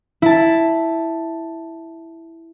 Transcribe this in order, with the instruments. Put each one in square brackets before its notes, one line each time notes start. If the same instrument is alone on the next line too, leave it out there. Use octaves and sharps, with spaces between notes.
[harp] E4 A5